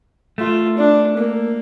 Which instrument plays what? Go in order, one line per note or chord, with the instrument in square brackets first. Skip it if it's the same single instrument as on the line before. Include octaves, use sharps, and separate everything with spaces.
[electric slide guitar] A3 [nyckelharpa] F4
[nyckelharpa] D4
A#3